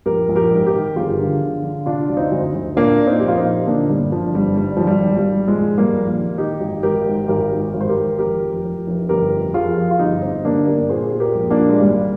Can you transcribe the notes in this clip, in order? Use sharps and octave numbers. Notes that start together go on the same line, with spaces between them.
A#1 G4 A#4
A#1
G4 A#4
G#2
G4 A#4
D#3
G1 F4 G#4
D3
D3
D3
C3 D4 F4
D2
C4 D#4
D2
D2
A#2 A#3 D4
A#2
C4 D#4
A#1 G4
F4
C4 D#4
A#2
D3 A#3 D4
G1 G3
D3 F3
G1 G3
G#2 G3
G#1 F3
G3
G#1
G3
D#3
A#1 F3 G#3
G#2
G3 A#3
A#1
D#3
D#3 D#4 G4
G#1
G#1 G4 A#4
G#2
G#1 G4 A#4
G#2
G#1
C5
G4 A#4
G#1
F1 G4 A#4
F2
F2
F1
G1 G4 A#4
F2
F2 F4 G#4
F2
F4
G1 D#4 G4
G1 C4 D#4
D3 A#3 D4
G1 G4 A#4
A#2 G#4 C5
A#2
G4 A#4
A#1
A#3 D4
A#2
G#3
G#1 G3